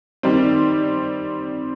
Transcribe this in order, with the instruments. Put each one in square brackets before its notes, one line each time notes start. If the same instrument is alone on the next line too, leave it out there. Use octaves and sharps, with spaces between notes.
[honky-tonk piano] D#3 G3 C4